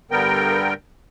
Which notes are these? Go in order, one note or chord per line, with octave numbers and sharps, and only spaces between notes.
G2 D3 G3 B3 A#4 G5